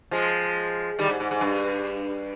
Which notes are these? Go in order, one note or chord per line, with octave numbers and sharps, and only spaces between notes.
F3 G#3
D#3 G3
G#2
G#2
G#2
G2